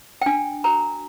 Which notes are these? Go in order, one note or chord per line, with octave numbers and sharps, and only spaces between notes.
G5
D4 G#5
F#4 A#4 A#5